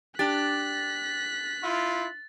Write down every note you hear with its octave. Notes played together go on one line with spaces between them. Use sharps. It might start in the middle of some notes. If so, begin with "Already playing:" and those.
D4 G4 F#6 A6 B6
E4 F4